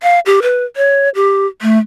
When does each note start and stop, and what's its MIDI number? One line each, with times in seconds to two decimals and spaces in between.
0.03 0.19 77
0.26 0.40 67
0.42 0.65 71
0.76 1.09 73
1.15 1.47 67
1.62 1.78 57